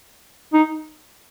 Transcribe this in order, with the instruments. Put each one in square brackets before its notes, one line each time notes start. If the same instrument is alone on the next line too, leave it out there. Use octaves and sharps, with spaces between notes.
[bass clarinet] D#4